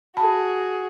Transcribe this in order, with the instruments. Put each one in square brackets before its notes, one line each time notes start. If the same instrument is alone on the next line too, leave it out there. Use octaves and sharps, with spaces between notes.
[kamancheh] F#4 G#4 [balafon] A5 B5